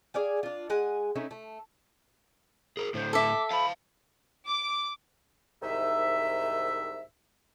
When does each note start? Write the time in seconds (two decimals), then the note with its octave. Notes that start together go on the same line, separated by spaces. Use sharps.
0.14 G#4 D5 F5 G#5
0.43 D4 F4
0.70 G#3 F#5 G#5
1.16 A3 C#4 D#4 E4
1.31 A3
2.77 G#4 A#4
2.94 A2 D3 C5
3.13 A4 E5 D6
3.51 F5 A5 B5
4.47 D6
5.62 C2 G#2 D#3 D#4 E5